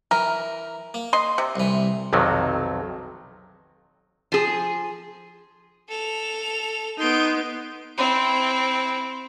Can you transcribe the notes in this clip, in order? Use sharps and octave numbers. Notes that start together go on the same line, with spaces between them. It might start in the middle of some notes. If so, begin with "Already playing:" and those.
E3 A#4
A#3
D#5 C6
C3
C2 E3
B1 F2 C3 D#3 F#3
F3 G#4
A4 F7
B3 D#4 C6 D7
C4 E4